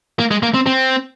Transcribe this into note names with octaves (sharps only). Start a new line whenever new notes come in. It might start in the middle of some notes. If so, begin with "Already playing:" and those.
A#3
G#3
A#3
C4
C4